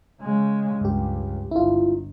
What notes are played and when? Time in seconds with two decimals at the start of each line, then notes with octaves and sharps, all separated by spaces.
0.21 C#3 G#3
0.81 C#2 G2 G4
1.51 G1 E4 F4